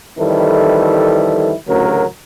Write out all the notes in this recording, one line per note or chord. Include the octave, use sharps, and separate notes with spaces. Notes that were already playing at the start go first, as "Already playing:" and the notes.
F2 D#3 E3 G3 E4 A4
A1 D2 C#3 F#3 A#4